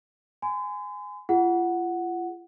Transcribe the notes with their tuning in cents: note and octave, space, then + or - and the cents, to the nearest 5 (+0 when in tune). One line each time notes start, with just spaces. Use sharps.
G#5 +0 C6 -45
F4 -35 G#4 -15 F#5 +0